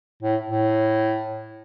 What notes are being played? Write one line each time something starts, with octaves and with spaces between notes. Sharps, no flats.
A2
A2